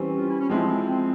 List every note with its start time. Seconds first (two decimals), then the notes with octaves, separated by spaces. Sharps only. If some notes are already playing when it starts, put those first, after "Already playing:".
Already playing: E3 G3 C4 C#4
0.17 F4
0.29 E4
0.39 C#4
0.49 F3 G#3 C4 E4
0.89 C4